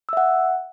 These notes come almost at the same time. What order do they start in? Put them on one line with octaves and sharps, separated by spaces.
E6 E5 F#5